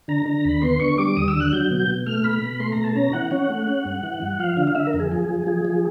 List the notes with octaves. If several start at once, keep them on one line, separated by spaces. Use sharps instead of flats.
D3 A#5
D3
D#2 B5
B3 C6
D3 C#6
G3 D6
D#2 D#6
E6
D3
F#6
F#3 G6
B2
B2
A3 F6
B2 B5
B2
A3 C6
A#5
B2
A5
C#4 A#5
E3 F#5
C#4 F#5
A3
C#4
G2
E3
G2
F3 F5
D3
F5
D3 E5
A#4
F2
G#4
F3 G#4
F3
F3 G#4
F3